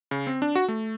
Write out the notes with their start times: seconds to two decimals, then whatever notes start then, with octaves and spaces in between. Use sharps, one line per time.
0.11 C#3
0.27 C4
0.42 D4
0.55 F#4
0.68 A3